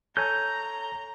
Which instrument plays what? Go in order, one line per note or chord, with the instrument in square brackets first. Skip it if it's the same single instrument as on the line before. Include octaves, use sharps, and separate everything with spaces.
[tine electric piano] A4 C#5 G#5 [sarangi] A#5 [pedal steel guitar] G6